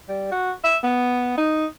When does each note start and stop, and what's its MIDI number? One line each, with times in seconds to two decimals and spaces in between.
0.09 0.28 55
0.32 0.52 66
0.64 0.77 76
0.84 1.34 59
1.38 1.66 63